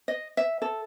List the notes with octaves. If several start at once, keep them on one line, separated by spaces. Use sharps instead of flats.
D#5
E5
A4